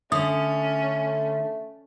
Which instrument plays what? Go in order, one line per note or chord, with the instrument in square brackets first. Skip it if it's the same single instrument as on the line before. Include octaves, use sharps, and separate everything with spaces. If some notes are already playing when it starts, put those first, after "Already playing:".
[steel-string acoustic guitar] D3 [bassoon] A3 [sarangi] C#4 [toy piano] D#6